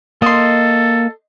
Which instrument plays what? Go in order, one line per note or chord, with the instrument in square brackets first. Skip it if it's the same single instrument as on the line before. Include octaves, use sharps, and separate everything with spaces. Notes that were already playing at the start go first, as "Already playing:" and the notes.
[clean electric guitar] A#3 [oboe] A4 [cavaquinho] D#5 C6